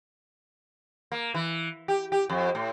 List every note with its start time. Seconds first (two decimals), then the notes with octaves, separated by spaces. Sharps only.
1.12 A#3
1.35 E3
1.88 G4
2.12 G4
2.30 F2
2.55 A2